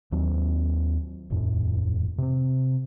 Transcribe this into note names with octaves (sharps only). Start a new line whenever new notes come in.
D#2 F#3 C4
D#1 F2 A2
C3 C4